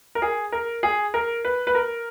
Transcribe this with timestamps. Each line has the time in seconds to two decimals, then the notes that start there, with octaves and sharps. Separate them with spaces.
0.15 A#4
0.22 G#4
0.52 A#4
0.83 G#4
1.14 A#4
1.45 B4
1.67 B4
1.75 A#4